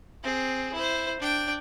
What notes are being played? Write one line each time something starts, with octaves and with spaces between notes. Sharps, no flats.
C4 G#4
E4 C5
D4 G5